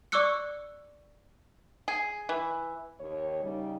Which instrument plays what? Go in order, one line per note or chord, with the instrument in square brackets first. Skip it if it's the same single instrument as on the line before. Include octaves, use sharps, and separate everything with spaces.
[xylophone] D5 C#6 D6 E6 F#6 C#7
[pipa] G#4
E3
[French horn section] D#2 C#5
C#3 G3 D#4